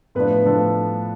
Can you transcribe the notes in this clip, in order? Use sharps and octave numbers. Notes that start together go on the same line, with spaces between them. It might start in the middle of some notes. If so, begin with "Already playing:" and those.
A2 F3 A3 B3 D4 B4
A2 F3 A3 D4 A4